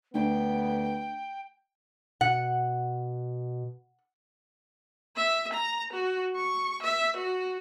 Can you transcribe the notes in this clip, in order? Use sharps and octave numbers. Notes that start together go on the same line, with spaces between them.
D2 A3 B3 D4 G5
B2 F#5
E5
A#5
F#4
C#6
E5
F#4